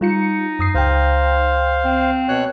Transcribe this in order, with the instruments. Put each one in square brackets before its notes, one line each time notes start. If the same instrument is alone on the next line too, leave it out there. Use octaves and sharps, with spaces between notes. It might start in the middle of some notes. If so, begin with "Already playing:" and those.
[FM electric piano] G3 F4 C#7 [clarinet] D#4
[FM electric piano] F#2 D#6 C7
[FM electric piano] C#2 G5 [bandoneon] C5 F5
[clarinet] C4
[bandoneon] B2 C#5 F#6